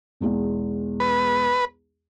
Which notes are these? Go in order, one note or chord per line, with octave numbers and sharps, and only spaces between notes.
B1 E2 G#3
B4